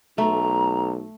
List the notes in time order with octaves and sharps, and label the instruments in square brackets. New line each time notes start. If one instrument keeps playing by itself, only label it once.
[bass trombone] B1 [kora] A3 [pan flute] A#5